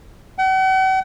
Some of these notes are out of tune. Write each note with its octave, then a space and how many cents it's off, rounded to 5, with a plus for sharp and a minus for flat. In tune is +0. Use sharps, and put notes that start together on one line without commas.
F#5 +45